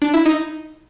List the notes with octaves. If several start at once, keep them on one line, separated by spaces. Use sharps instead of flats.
D4
E4
D#4